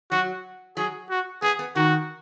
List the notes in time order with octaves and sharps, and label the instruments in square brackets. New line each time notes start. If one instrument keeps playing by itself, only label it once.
[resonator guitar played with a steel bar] F#3 [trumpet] F#4
[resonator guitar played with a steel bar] F#3 [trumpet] G#4
[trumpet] F#4
[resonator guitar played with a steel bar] B3 [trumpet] G#4
[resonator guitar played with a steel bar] B3
[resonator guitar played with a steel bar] D#3 [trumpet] F#4